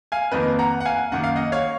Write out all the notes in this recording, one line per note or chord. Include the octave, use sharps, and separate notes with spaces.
F5 G#5
F2 D#3 A#3 B4 D#5
F#5 A#5
F#5
F5 G#5
F#2 D#3 A#3 F#5
F5
D#5 F#5
C#5 F5